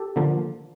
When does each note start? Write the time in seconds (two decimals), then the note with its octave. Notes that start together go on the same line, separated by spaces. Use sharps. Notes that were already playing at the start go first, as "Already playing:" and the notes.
Already playing: G4 A4
0.16 D3 F3 A#3